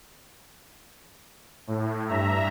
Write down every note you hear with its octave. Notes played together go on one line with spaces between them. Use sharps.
A2
G2 E5 A#5